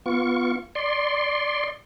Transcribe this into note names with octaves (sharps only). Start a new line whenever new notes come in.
B3 F4 C#6
D5 C6